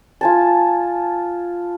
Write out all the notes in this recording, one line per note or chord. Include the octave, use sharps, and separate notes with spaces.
F4 G#5 A5